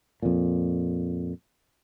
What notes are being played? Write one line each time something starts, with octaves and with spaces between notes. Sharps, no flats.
F2 A#2